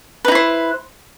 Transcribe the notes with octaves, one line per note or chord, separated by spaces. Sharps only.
D#4 E4 B4 C5